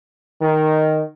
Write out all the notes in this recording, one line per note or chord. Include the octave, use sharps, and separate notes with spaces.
D#3